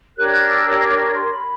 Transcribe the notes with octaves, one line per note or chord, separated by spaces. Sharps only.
D4 G4 A#4 C#5 F#6
E6
D6
C#6
C6
C6
B5